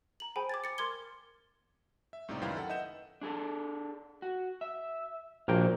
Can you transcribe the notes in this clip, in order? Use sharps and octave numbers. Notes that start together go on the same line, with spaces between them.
A#5 F#7
G#4 C5 G5 G#5 B5
D6 G#6 A6
D6 A6 C#7
A#4 C6 D6 G#6 G7
E5
C#2 A2 C3 D#4 D5
F#2 D#3 E4 B4 F5 G5
A4 F#5
B4 D#5 E5 F#5 G6 E7
D4 G#4 A4
F#4
E5
A#1 A#3 F#4 C#5 F5 G5